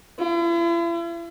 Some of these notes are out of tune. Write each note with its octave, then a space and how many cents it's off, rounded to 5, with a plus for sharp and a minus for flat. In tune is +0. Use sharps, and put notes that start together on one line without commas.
E4 +45